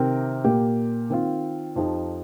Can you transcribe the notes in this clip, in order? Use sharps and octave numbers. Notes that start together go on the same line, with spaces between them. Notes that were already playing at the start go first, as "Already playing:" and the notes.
Already playing: C3 D#3 C4 G4 A#4
A#2 A#3 G4
D#3 C4 F4
F2 F3 D#4 G4